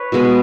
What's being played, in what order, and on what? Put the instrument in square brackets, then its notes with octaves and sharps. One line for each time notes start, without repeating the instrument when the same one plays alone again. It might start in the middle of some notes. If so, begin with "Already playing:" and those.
Already playing: [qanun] B4 C#5
B2 G#3 B3